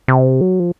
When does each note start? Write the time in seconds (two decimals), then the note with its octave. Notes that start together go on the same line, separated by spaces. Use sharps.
0.08 C3
0.41 F#3
0.60 F3